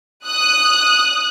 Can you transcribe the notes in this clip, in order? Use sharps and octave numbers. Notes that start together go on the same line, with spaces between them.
D#6 F#6